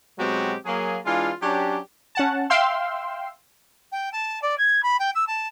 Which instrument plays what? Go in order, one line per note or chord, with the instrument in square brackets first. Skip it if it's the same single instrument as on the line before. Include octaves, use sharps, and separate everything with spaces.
[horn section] B2 F#3 G#3 C4 F#4 G4
F#3 A#3 G#4
E3 G#3 D4 F4
F#3 C#4 D4 G4
[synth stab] C#4 F#5 A5
E5 F5 G5 C6 E6
[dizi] G5
A5
D5
G#6
B5
G5
E6
A5